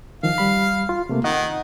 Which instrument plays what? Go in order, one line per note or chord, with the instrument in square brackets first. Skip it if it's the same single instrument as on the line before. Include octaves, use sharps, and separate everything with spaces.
[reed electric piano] D#3 F3 [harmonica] F5
[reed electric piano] G3 B5
F4
C3 A3 A#3
[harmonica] D#3 [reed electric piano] D#5 F#5